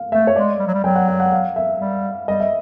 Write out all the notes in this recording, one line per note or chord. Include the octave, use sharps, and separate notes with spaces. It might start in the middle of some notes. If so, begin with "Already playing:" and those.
Already playing: F5
A3 E5
C#5
G#3 D5
G3
F#3
G3
F#3 G5
F#5
F#5
F#5
F5
E5
G3
G3 D#5
E5